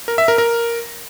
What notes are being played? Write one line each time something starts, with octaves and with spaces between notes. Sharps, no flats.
A#4
E5
A#4
A#4